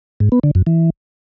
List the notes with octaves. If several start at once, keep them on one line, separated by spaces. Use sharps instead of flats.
G#2
B3
D3
F#2
E3